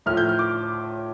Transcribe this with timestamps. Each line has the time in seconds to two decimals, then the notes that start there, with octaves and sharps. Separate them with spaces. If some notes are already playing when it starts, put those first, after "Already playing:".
0.06 A2 F3 A3 F6
0.17 G6
0.29 F6
0.39 D6